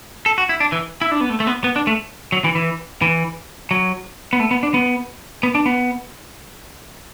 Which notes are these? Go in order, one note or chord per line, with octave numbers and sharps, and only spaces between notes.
A4
F#4
E4
D4
E3
E4
D4
B3
A3
A3
B3
B3
D4
A3
F#3
E3
E3
E3
F#3
B3
A3
B3
D4
B3
B3
D4
B3